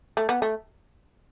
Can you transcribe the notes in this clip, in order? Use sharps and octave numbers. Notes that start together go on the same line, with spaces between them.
A3
B3
A3